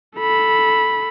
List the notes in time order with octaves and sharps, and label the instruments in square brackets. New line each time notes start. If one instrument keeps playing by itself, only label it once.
[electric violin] A4 B5